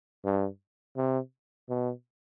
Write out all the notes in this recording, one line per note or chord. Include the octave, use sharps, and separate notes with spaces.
G2
C3
B2